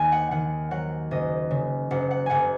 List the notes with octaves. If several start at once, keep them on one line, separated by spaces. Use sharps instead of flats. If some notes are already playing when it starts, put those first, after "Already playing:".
Already playing: D#2 D#3 D#5 G#5
F#5
D#3 F#5
F#3 F#5
F#1 D#5
C#3
F#1 F#5
F#5
F#1 F#5 G#5